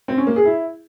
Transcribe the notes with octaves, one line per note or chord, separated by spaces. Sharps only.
C4
C#4
A#3
G#4
E4